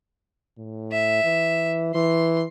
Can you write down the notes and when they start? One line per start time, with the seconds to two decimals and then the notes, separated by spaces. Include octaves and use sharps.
0.58 A2
0.92 E5
1.24 E3
1.95 E3 C6